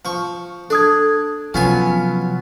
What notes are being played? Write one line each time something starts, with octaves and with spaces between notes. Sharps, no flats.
F3 C#6
D4 A4 D#6 G#6
C3 F3 F#3 B3 C#4 F4 G#5